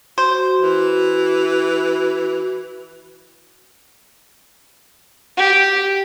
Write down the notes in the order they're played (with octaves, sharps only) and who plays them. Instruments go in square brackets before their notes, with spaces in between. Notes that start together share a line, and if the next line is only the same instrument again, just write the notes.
[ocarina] F#4 [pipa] C5
[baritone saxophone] E3
[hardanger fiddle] G4